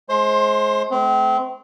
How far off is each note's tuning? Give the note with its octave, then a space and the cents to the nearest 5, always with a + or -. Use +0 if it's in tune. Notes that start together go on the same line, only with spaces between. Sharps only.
G#3 +30 C5 +25 C6 +0
A3 -45 C4 -30